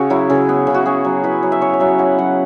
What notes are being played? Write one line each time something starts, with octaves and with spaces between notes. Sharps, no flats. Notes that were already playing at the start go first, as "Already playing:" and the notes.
Already playing: C#3 C#4 F#4 C#5 E5
F#3 E4
C#3
B3
C#3
F#4
C#4 G#4
F#3
E4 B4
F#3
E5
C#4 C#5
C#5
F#3 E5
E4 F#5
F#3 F#5